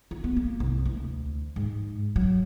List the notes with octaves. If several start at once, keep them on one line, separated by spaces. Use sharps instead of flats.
F4
B3
A#3
C2
D2
G#2
F#3